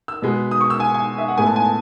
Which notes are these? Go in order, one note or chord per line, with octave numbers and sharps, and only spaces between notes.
E6
B2 G#3 B3
D#6
C#6
E6
G#5
G#5
E5
F#5
A2 G#3 B3 G#5
A5
G#5
A5